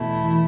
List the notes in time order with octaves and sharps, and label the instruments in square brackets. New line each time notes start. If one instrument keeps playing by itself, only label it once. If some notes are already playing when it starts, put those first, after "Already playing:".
Already playing: [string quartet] E2 B2 A3 E4
[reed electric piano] E3